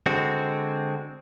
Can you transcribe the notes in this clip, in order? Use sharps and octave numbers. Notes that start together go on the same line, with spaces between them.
D3 G#3 C4 F#4